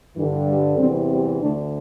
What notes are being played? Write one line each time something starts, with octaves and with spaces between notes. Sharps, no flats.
G2 D3 E3
G3
E2 C3 E3 G3 C4
G3 C4
D2 D3 A3 D4